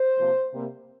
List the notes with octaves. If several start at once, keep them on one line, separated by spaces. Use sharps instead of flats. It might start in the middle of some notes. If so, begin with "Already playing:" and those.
Already playing: C5
C3 F3 A#3
C3 G3 A#3